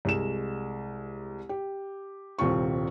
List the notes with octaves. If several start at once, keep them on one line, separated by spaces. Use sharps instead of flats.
C2 G#3 E7
G4
D#1 C2 C4 F4 C#6